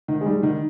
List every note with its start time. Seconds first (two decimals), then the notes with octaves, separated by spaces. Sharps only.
0.08 D#3
0.21 G#3
0.26 G3
0.43 D#3